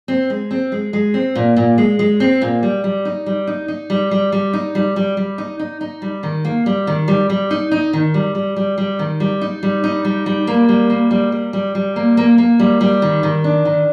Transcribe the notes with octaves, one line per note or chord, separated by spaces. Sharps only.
C4
G#3
C4
G#3
G#3
C4
A#2
A#2
G#3
G#3
C4
A#2
G3
G3
D#4
G3
D#4
D#4
G3
G3
G3
D#4
G3
G3
G3
D#4
D#4
D#4
G3
D#3
A#3
G3
D#3
G3
G3
D#4
D#4
D#3
G3
G3
G3
G3
D#3
G3
D#4
G3
D#4
G3
G3
A#3
G3
A#3
G3
G3
G3
G3
A#3
A#3
A#3
G3
G3
D#3
D#3
D4
D#3